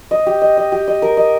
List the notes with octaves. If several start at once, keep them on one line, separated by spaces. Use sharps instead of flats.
D#5
G4
D#5
D#5
G4
D#5
A#4
D#5